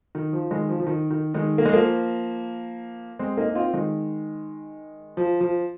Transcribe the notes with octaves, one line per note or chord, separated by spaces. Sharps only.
D#3
F3
D#3 G#3
F3
F3
D#3
D#3
D#3 G#3
A#3
G#3
F3 A#3
G#3 C4
A#3 D#4
D#4
C4 F4
D#3 G#3
F3
F3